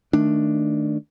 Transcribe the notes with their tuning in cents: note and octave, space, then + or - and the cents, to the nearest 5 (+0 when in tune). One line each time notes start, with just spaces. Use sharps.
D#3 +0 A3 +0 D4 +0